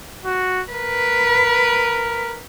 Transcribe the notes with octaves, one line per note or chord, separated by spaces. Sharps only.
F#4
A#4 B4